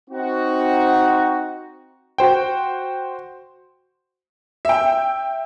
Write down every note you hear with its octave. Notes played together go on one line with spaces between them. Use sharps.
C4 D#4 F#4
F#4 C5 G5
E5 G5